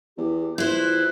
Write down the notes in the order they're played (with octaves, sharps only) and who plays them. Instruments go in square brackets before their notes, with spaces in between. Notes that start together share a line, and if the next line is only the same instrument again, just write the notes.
[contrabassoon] E2 [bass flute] G4
[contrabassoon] E2 [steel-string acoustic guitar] E4 C5 [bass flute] F4 [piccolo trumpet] F#6